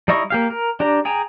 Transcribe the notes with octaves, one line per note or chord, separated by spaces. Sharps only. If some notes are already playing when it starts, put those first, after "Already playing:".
G3 D#4 E4 D#5 C#6
A#3 G4 F5
A#4
D4 G4 A#5
G#4 G5 G#5 A#5